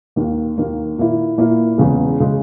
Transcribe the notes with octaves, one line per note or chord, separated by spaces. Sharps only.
D#2 D#3 A#3
D#2 D#3 A#3
A#2 A#3 E4
A#2 A#3 E4
E2 C#3 G#3
C#3 G#3